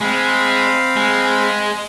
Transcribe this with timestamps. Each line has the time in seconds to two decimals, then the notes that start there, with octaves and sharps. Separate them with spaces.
0.01 G#3 C4 F5 B5
0.96 G#3